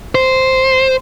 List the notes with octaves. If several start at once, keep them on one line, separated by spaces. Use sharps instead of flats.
C5